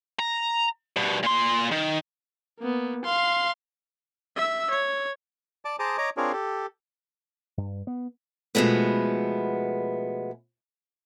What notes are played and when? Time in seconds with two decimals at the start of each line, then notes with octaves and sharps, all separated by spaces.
0.19 A#5
0.96 G2 B2
1.23 A#2 C6
1.71 D#3
2.60 A#3 B3
3.05 F5 C6
4.36 E5 E6
4.70 C#5
5.65 D5 A5 D6
5.79 G#4 C5 A5 A#5 D6 D#6
5.98 C#5 D#5 A#5 D6
6.17 C4 D4 F4 G#4 A#4 C#5
6.32 G4 A4
7.57 G2
7.87 B3
8.55 B2 F3 G#3 A3 B3